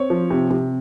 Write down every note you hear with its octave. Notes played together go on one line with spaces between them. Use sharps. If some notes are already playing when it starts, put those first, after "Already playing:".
Already playing: C4 C#5
F3
C3
C3